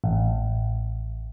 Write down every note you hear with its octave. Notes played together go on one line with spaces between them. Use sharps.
A1